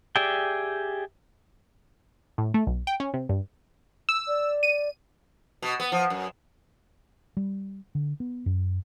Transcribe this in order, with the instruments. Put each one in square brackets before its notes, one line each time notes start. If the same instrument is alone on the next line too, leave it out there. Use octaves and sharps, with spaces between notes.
[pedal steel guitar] G4 G#4 D5 E5 G5
[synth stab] A2
A3
B1
G5
C#4
C3
G2
E6
[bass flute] D5
[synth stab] D#7
[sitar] B2
B3
F3
F#2
[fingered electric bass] G3
D3
B3
F#2